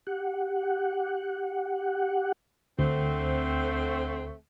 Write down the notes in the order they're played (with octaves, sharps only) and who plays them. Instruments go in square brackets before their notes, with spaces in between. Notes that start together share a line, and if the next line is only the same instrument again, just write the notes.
[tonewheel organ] G4 F#5
[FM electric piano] D2 [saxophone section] D3 A3 C4